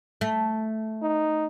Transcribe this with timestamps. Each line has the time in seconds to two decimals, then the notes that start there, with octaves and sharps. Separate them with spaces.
0.21 A3
1.02 D#4